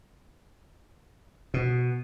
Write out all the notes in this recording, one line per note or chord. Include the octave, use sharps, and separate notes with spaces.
B2